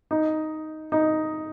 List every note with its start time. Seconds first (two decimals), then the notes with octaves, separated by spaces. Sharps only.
0.11 D#4
0.92 D#4